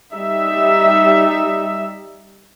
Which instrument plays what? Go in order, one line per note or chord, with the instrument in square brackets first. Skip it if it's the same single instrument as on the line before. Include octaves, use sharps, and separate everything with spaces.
[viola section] G3 D#4 E5